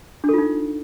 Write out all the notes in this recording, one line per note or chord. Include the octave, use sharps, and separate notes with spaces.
D4 D#4 F4 A4